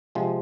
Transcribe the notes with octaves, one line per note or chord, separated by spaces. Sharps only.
C3 F3 G#3